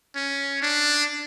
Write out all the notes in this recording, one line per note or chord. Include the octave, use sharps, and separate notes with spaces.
C#4
D4